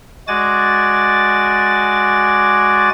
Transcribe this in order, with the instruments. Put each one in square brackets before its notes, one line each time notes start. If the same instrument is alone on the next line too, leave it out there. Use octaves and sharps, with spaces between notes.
[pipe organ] G#3 F#4 D5 G#5 D6 A6